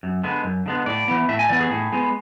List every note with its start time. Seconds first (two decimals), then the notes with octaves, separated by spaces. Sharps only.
0.03 F#2
0.24 D3 G#3 B3
0.44 F#2
0.66 D3 G#3 B3
0.86 A2 D5
1.08 E3 B3
1.29 A2 E5
1.39 G#5
1.49 E3 B3 D5
1.60 G#4
1.71 A2
1.92 G#3 B3